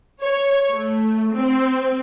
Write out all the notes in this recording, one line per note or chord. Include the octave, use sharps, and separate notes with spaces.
C#5
A3
C4